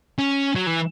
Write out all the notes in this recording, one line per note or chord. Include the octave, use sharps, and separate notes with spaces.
C#4
F#3
E3